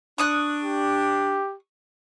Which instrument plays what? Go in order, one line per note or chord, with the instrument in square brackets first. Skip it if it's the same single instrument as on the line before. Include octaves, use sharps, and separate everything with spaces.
[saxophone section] D4 [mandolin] C#6 D#6 F#6
[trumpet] G4